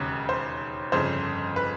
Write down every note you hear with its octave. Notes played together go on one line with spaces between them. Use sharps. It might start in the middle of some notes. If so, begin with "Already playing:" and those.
Already playing: E1 D#2 C#3 B4
C5
G1 F2 C#3 C5
B4